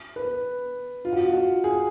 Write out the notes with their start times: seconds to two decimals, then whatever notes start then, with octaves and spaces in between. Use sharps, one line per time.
0.16 B4
1.05 F4
1.13 F#4
1.19 F4
1.34 F#4
1.64 G#4